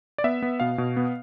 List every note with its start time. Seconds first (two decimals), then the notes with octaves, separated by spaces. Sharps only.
0.18 D5
0.24 B3 E5
0.42 B3
0.60 B2 F5
0.78 B2
0.97 B3